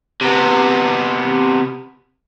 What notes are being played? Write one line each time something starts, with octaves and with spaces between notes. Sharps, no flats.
C3 B3